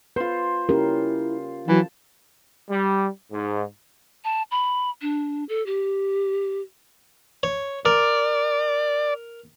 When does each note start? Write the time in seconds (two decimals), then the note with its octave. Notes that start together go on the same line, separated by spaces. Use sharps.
0.16 F4 B4 C5
0.69 C#4 E4 G4 A#4
1.68 E3 F#3 A5
2.69 G3
3.31 G#2
4.24 A5
4.51 B5
5.02 D4
5.49 A4
5.66 G4
7.43 C#5
7.85 A#4 D5